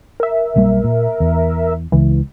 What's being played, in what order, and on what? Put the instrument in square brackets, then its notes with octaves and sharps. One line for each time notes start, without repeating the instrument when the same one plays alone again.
[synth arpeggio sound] A#4 E5
[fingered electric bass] B1 G3 A#3
A#2
E2
[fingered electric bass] C#2 [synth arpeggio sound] E3